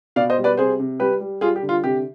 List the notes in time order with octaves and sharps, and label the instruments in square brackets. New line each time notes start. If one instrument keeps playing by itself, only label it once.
[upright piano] B2 D5 F5
C5 D#5
G3
B4 D5
C3 G#4 C5
C3
G3 G4 B4
G3
G3 F4 G#4
G4
D3
F4
C3 G4